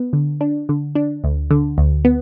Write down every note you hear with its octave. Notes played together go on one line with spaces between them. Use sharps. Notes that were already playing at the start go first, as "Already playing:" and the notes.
Already playing: B3
D3
D4
D3
D4
D2
D3
D2
B3